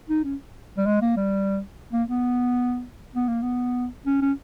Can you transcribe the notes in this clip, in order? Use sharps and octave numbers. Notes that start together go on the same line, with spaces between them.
D#4
C#4
G3
G#3
A#3
G3
A#3
B3
B3
A#3
B3
C#4
C#4